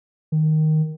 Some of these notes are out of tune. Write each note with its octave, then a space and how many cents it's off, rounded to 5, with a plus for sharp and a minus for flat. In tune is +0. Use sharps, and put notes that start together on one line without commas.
D#3 +0